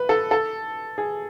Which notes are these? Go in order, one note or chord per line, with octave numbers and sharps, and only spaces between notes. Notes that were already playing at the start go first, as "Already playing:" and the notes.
Already playing: B4
A4
A4
G#4